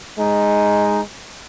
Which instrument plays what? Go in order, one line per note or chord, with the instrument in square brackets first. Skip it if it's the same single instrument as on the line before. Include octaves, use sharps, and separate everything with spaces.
[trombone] G#3 [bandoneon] D#4